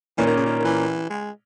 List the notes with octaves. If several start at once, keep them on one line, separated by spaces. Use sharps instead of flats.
A#2 E3 A#3 C#4
D#3
C#3
D#3
D#3
E3
G#3